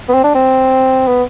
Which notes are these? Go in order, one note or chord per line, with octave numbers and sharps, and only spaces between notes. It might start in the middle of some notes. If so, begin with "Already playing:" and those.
B3
C4
D4
C4
B3